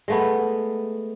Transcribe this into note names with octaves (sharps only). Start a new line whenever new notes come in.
G#3 A3 B3